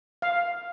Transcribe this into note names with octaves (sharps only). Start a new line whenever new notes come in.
F5